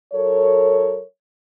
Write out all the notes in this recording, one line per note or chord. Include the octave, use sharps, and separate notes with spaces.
F#3 A4 A#4 C#5